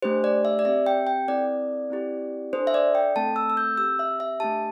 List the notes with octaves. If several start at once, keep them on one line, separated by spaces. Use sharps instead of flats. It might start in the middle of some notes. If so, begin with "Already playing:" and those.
A3 D4 G4 C5
D5
E5
D5
C4 G4 E5
G5
G5
C4 E4 A4 D5
C4 E4 G4
D4 A4 C5
E5
D5
G5
A3 C4 A4 A5
E6
E6
G6
C4 G4 E6
E5
E5
A3 D4 G4 A5